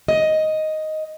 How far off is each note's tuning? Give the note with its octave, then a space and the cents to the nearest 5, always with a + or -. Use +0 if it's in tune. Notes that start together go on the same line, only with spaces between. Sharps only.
D#5 +5